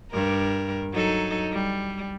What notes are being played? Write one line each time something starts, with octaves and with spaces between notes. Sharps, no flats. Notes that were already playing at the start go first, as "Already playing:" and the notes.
G2 A#4
F#3 D#4 A4
G3